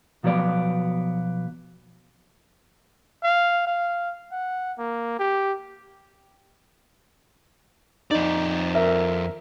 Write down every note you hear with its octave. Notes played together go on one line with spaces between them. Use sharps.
B1 F3 F#3 B3 D5
F5
F5
F#5
A#3
G4
F2 D#4 D5
A#4 E5